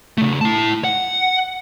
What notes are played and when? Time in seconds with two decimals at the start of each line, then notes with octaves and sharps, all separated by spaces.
0.18 C#3 A3
0.41 E4 A5
0.84 F#5